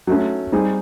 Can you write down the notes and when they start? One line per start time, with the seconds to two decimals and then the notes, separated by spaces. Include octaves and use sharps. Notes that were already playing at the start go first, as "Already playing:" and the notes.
0.07 F#3 A3 C#4
0.52 G3 C4 D#4 G#4